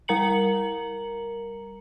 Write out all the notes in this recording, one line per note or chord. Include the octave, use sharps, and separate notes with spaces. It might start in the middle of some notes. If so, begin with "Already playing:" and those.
G3 A#4 A#5 C#7 F#7